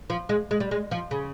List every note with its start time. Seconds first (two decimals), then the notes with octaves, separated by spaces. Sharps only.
0.10 F3
0.29 G#3
0.51 G#3
0.60 G3
0.71 G#3
0.91 F3
1.11 C#3